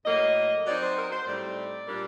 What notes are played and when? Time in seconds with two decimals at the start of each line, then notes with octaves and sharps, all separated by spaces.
0.05 A2 F#3 A#3 D#5
0.66 F#3 C4 D#4 D5
0.81 C5
0.96 A#4
1.11 C5
1.26 A2 G3 C4 D#4 D5
1.87 A#2 G3 A#3 D4